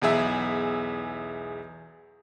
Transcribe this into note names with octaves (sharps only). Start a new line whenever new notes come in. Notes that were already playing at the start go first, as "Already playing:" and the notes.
B1 E2 G#4 E5